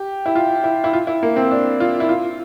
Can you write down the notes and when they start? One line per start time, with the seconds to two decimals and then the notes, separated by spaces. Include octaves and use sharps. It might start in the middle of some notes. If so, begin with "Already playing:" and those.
Already playing: G4
0.26 E4
0.35 F4
0.64 E4
0.84 E4
0.93 F4
1.07 E4
1.23 A#3
1.36 C4
1.51 D4
1.80 F4
2.00 E4
2.09 F4